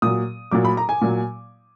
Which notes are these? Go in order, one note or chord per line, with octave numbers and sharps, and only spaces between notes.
A#2 F#3 D#6
A#2 F#3 D6
B5
A#5
G#5
A#2 F#3